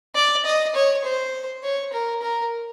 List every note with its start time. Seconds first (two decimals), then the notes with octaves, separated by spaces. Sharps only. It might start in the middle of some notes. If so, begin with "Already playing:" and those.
0.15 D5
0.45 D#5
0.75 C#5
1.04 C5
1.63 C#5
1.93 A#4
2.22 A#4